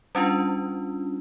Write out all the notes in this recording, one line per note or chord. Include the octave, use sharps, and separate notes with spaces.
G3 C#4 D4 F4